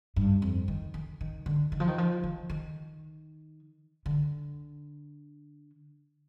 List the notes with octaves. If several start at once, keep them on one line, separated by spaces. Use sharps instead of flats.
G2
F2
D#3
D#3
D#3
D3
D#3
F3
D#3
F3
D#3
D#3
D3